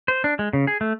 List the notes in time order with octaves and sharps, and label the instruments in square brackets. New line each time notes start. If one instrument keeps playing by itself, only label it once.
[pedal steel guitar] C5
D4
G#3
C#3
G#4
A3